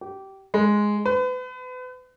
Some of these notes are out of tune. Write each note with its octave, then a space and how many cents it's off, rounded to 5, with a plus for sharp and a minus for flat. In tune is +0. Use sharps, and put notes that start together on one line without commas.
G4 -20
G#3 +0
B4 +35